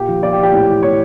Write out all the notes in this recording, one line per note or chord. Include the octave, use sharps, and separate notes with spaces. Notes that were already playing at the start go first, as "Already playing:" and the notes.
Already playing: A#2 G4
F3
A#2 D5
G4
F3
G4
A2
E3
A2 C#5